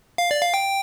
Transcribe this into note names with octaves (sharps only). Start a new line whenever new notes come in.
F5
D5
F5
G5